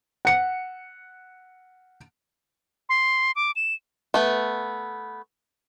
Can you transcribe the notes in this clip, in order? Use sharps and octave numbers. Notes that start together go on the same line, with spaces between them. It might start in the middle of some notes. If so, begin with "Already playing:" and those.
F#5 C#7
C6
D6
E7
A3 B3